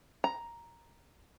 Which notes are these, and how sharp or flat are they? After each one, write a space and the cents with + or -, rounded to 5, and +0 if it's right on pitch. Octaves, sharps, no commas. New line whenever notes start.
A#5 +5